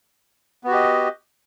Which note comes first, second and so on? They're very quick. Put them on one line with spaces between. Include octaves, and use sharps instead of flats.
B3 F#4 G4 D#5